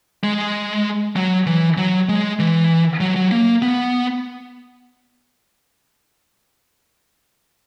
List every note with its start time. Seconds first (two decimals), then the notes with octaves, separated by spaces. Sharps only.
0.24 G#3
1.16 F#3
1.46 E3
1.77 F#3
2.09 G#3
2.39 E3
3.00 F#3
3.16 F#3
3.31 A#3
3.62 B3